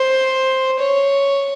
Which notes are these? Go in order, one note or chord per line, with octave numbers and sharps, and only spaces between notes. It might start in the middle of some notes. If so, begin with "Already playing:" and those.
Already playing: C5
C#5